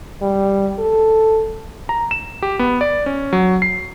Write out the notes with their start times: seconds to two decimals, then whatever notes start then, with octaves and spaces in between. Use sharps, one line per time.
0.21 G3
0.79 A4
1.89 A#5
2.11 E7
2.42 G4
2.59 B3
2.81 D5
3.06 C#4
3.33 F#3
3.62 C7